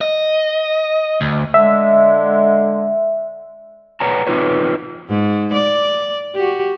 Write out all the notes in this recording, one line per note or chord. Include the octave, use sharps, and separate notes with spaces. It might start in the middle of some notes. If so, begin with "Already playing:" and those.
D#5
D2
D3 G#3 E5
B4 C#5 F#5 G#5 A#5
C4 D#4 F4 B4 C#5
G#2
D5
F#4 G4